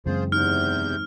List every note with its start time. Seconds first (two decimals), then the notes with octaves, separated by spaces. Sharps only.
0.06 F#2 C#3 E3 G#3 C4 F4 G#4 C5
0.32 E2 C3 D#4 F6 G6